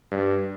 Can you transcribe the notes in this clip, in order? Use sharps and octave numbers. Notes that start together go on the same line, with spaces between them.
G2